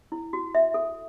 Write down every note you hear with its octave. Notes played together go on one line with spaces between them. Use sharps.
E4
F#4
E5
A4